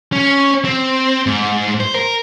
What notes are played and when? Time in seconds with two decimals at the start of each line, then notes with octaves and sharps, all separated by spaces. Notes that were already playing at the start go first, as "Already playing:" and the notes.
0.12 C#4
0.65 C4
1.26 G#2
1.80 C5
1.95 A#4